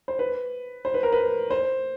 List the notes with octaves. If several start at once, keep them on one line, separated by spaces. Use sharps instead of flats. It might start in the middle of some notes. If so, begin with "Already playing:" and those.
C5
B4
C5
B4
A#4
B4
C5